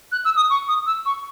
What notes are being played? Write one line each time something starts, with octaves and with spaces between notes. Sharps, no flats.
F#6
E6
D#6
C#6
D#6
E6
C#6